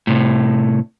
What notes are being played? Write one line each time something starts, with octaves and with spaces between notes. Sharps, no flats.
A2 C3